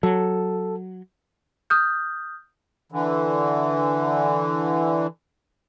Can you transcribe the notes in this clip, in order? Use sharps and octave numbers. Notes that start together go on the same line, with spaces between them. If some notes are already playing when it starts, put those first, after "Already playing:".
F#3 A4
D#6 F6 G6
D3 E3